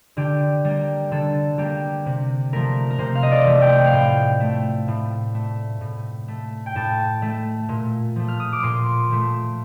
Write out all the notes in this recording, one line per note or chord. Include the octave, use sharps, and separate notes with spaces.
D3 G4
G3 A#3
D3 A4
G3 A#3 G4
C3
F3 A3 A#4
A#4
C3 C5
F5
D#5
D5
F3 A3
G5
F5
A2 G5
A3
A2
A3
A2
A3
G5
A2 A5
A3
A#2
F3 A3
F6
D#6
D6
A#2 C6
F3 A3